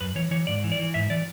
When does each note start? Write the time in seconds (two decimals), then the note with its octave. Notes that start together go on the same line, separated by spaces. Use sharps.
0.01 F#2 B4
0.15 E3 C#5
0.31 E3 C#5
0.47 G#2 D5
0.64 E3
0.72 D5
0.79 E3
0.94 G#2 E5
1.10 E3 D5